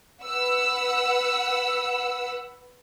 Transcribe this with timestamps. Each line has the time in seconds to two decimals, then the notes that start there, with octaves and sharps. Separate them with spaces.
0.22 B4 F#5 B5 E6